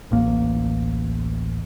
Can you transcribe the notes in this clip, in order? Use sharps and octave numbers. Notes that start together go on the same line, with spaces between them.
D1 A1 A#3